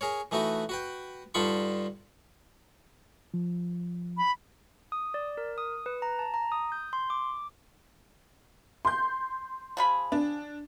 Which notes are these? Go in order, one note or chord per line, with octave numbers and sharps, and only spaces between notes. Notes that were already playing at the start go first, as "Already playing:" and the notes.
G#4 A#4 C#5
E3 A3 D#4 F#4 B4
F#4 B4 G5
G2 D3 D#4 F4 B5 C#6
F3
B5
D#6
D5
A#4
D#6
B4
A#5
A5
A#5
D#6
G6
C6
D6
C6 G6
F3 G#4 B5
D4